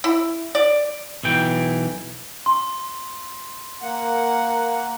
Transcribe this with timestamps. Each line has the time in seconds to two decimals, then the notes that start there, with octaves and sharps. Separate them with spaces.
0.04 E4
0.55 D5
1.23 B1 E3 G5
2.46 C6
3.82 A#3 F#5